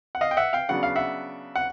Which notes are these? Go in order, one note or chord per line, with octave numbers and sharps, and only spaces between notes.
F#5
D#5 F5
G5
E5 F#5
F5 G5
C#3 F#3 B3 D4 F#5
F5
E5 F#5
F#5